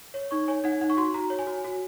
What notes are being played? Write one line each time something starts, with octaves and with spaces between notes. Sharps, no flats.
C#5
D#4 C#6
C#5 G#5
D#4 F#5
D#4 F#5
C#6
F#4 C6
F#4 A#5
C#5
G#5
F#4
F#4